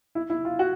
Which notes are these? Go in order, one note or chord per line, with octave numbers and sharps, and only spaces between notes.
E4
E4
F4
F#4